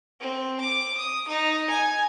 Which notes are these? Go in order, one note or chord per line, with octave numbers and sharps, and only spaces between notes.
C4
D6
D#6
D#4
G#5